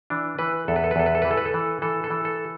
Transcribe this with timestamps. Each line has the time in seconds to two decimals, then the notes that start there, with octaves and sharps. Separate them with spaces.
0.10 E3 D4
0.39 E3 B4
0.68 E2 A4
0.76 B4
0.84 A4
0.91 B4
0.96 E2 A4
1.06 B4
1.15 A4
1.22 E3 B4
1.31 A4
1.37 B4
1.46 A4
1.54 E3
1.82 E3 A4
2.04 A4
2.10 E3
2.25 A4